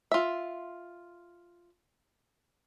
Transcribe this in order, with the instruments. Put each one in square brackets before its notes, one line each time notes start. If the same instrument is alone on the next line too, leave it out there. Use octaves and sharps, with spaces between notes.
[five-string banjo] F4 E5